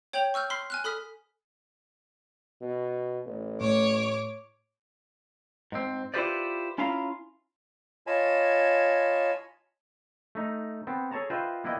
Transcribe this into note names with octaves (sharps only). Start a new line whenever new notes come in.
C#5 G5 G6 F7 F#7
C#6 E6 F6 G6
B5 C6 F6 B6 C7
G#5 F6 F#6
A4 B5 D#6 F6 B6
B2
A1
A2 C#5 D6
G#2 C4
E4 F4 G4 B4 C5 D5
C#4 E4 F4 F5 A#5
F4 C#5 D#5 G#5 A5 B5
A3 D#4 A#5
B3 C4
G#4 A4 C#5 A5 A#5
F4 B4 C5 D#5 E5 G5
A#3 B3 E4 D5 D#5 G5